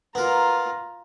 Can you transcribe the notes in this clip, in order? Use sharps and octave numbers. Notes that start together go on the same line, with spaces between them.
B3 F4 A#4 A#5